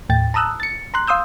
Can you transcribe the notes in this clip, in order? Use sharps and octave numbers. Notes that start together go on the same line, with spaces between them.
D#2 A2 G5 A6
A5 A#5 D#6 E6 F#6
A6 C#7
A#5 C6 F#6
F5 C6 D#6 E6 G6